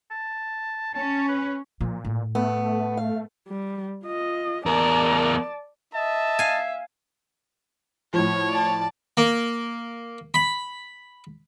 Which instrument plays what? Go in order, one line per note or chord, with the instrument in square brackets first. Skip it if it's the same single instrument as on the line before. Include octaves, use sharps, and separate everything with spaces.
[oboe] A5
[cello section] C#4 [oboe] A5
[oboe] B4
[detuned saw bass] A#2 [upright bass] F3
[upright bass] A2
[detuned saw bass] A3 [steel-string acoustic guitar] B3
[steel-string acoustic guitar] F5
[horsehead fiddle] G3
F4 D#5
[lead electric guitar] E2 A#4 [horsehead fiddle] D5 A5
[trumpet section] D#5 A5 [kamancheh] E5
[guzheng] F5 G#5
[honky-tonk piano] A2 F3 [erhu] C#5
[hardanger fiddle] D5 A5
[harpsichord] A#3
B5